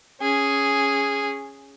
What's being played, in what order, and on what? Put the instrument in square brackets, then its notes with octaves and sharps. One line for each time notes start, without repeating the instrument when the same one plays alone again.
[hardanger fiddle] C#4 G#4